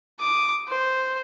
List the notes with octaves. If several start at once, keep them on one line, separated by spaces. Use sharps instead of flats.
D6 D#6
C5